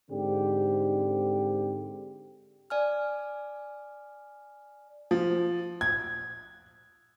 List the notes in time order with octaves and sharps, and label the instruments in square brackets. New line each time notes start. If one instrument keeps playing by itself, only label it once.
[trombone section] G#2 D3 C4 G4
[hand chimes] D5 G#5 F6
[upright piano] F3
G#6